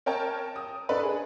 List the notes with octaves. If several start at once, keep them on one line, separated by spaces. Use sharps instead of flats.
A#4 C#5 G5 A5
D#6
D4 A4 B4 B5
G#4